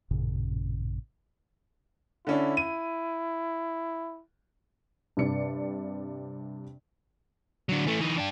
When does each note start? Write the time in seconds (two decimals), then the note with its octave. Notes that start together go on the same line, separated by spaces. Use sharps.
0.11 A1 F#2 A#2 C#3
2.27 D3 C#4 D4 E4
2.57 D#7
5.17 G2 C3 D5 C#7
7.69 D3 F#3
7.86 E3 A3
8.01 E3 D#4
8.18 D4 G4